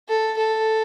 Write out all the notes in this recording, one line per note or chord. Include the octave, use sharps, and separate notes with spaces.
A4
A4